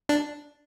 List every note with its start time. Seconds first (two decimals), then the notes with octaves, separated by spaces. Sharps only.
0.09 D4